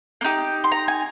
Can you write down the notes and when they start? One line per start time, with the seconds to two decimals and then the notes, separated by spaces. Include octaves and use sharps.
0.21 A#3
0.24 D#4 G4
0.64 C6
0.72 A#5
0.88 G#5